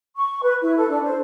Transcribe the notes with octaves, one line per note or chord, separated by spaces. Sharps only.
C#6
B4
E4
A4
D4
C5